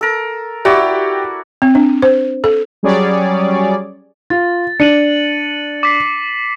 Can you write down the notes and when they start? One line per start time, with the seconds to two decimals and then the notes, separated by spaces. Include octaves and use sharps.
0.01 A4 A#4
0.65 E4 F#4 G4 D5
1.62 C4
1.75 D4
2.02 C5
2.44 A4
2.83 F#3 G3 C#4 G#4 C#5 D5
4.30 F4 A6
4.80 D4 C#7 D#7 F#7
5.83 D6 B6 C7